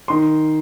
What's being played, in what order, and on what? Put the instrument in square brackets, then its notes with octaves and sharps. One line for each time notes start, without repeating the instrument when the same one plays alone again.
[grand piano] D#3 C6